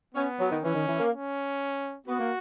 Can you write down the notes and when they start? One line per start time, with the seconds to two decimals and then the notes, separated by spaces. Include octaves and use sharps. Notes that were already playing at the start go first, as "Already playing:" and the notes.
0.14 B3 C#4
0.38 F#3
0.50 D#3
0.62 E3 C#4
0.74 D#3
0.87 E3
0.99 A#3
1.11 C#4
2.07 B3 F#4
2.19 A#3